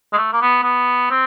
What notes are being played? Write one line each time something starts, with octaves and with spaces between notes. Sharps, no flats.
G#3
A3
A#3
B3
B3
C4